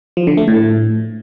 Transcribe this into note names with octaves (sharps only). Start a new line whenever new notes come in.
F3
D3
A3
A2